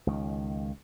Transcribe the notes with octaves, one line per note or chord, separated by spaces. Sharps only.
C#2 D#3